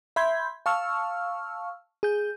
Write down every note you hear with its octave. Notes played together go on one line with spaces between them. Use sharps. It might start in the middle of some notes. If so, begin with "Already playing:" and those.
E5 B5 C6 G6 G#6
F5 A5 C#6 E6 F6
G#4 G6